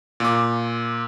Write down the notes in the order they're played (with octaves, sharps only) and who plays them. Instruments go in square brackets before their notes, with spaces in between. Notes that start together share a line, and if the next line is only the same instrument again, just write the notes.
[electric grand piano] A#2 D6